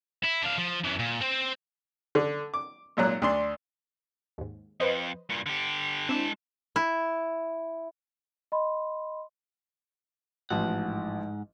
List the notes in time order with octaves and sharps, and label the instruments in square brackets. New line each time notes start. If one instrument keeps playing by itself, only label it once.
[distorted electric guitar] E4
D4 F5
F3
F#2 E3
A#2
C4 C5
[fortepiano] D3
D6
G#1 A#2 F#3 F#6
D2 D4 C6
[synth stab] D#2 G#2
[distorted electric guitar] F2 [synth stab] B4 C5 D#5
[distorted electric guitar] G2 A#2
D3 G4
[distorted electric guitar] G#3 A5 [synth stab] C4 D4 E4
[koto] E4
[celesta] D#5 B5 C6
[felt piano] A1 F3 [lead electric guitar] G#2 F#5